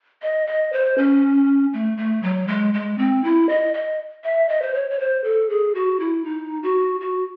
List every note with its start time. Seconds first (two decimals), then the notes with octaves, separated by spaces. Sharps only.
0.22 D#5
0.47 D#5
0.73 C5
0.98 C#4
1.73 A3
1.97 A3
2.23 F#3
2.48 G#3
2.74 G#3
2.98 C4
3.24 E4
3.49 D#5
3.74 D#5
4.24 E5
4.49 D#5
4.62 C5
4.74 C#5
4.90 C#5
4.99 C5
5.24 A4
5.50 G#4
5.75 F#4
6.00 E4
6.25 D#4
6.63 F#4
7.01 F#4